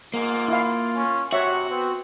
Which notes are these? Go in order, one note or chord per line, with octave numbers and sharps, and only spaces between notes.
G#2 A#3 F4
E4 F5
C#4
C3 F#4 C#5 E5 F#5
B3 C4